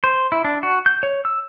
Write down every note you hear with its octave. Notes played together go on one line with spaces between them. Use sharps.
C5
E4
D4
F#4
G6
C#5
E6